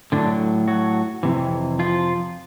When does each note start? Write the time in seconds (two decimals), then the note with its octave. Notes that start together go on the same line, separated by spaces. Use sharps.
0.12 A2 D3 F#3 D4
0.68 F#3 F#4
1.23 F2 C3 E3
1.79 F3 F4